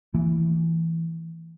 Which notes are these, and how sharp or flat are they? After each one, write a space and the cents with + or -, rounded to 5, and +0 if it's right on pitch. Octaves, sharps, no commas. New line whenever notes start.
E3 +0 A#3 -45